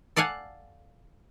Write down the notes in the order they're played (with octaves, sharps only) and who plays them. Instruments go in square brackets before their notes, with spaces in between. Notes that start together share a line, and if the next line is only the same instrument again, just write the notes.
[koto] A4 D5 F5 F#5 G#5